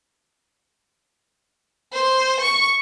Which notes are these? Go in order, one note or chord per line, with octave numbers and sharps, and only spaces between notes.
C5
C#6